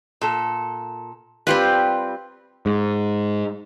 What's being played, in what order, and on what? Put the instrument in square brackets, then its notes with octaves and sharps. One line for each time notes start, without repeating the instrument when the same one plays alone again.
[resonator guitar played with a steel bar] A#2 A4
[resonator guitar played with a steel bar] G3 F4 [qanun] C4 G4 B4
[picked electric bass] G#2